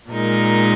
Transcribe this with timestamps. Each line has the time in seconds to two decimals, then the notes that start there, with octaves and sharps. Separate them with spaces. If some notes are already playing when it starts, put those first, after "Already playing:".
0.10 A#2 G#3 D#4 A#4